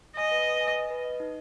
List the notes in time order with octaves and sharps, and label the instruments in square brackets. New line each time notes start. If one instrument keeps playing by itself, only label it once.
[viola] D#5 [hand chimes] G#5
[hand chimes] B4
B4
G#5
D#5
B4
D#5
D#4